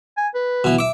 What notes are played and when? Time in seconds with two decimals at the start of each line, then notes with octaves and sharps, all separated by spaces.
0.17 G#5
0.35 B4
0.64 B2 E3
0.79 E5 D6